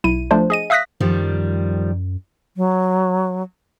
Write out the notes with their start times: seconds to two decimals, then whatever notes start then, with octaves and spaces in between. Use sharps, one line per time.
0.04 B1 E4 D#7
0.31 F3 A3 D4 C5
0.50 G#4 D#5 D#7
0.70 E5 F5 D#6 F#6 A#6 B6
1.00 F#2 D#3 F3 G3
2.57 F#3